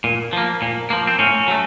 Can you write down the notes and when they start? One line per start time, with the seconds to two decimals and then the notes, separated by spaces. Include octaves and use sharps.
0.04 A#2
0.33 F3 A#3
0.62 A#2
0.90 F3 A#3
1.07 C4
1.19 A2 C#4
1.48 F#3 A3